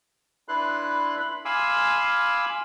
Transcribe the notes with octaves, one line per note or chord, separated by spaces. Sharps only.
D4 E4 B4 C6 F#6
B5
F5 G#5 B5 C6 D6 E6